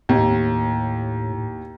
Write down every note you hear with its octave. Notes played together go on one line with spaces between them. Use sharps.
D#2 A2